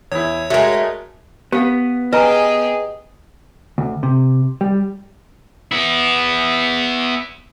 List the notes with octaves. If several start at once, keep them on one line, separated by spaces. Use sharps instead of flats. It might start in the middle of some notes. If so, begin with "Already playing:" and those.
E2 E4 C#5
G#3 A3 F#4 G#4 A#4
B3 G4 F5
G4 G#4 B4 D#5 G#5 A#5
D2
C3
G3
B3 E4